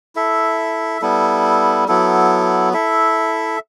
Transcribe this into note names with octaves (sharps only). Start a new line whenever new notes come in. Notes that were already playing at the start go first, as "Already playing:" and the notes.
E4 A4 E5
G3 B3 E4 A4
F#3 B3 E4 A4
E4 A4 E5